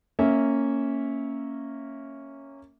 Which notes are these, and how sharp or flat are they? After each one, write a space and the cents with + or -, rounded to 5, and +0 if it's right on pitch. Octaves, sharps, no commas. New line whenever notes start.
A#3 -15 C#4 -5 E5 -20